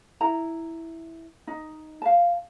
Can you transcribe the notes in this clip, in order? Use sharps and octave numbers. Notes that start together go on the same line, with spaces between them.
E4 A#5
D#4
F5 A5